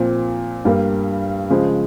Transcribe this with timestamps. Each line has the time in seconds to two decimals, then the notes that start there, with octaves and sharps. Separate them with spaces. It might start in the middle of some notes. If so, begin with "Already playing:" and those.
Already playing: A#2 F3 C4
0.65 G2 G3 A#3
1.50 C#3 F3 G#3